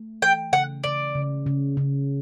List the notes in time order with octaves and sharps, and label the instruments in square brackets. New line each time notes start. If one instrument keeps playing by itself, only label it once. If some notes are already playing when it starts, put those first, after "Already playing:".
Already playing: [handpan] A3
[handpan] E3 [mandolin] G5
[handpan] C#3 [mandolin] F#5
[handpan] C#3 [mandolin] D5
[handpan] C#3
C#3
C#3